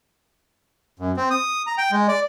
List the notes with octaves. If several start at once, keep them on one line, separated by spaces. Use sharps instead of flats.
F#2
C4
D#6
A#5
G5
G#3
D5